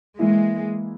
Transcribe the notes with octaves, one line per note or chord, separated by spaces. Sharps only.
E3 G#3 A#3 E4